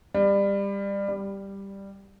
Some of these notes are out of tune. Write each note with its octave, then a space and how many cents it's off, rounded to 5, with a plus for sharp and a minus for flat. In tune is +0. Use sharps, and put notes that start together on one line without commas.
G3 +25
G3 +5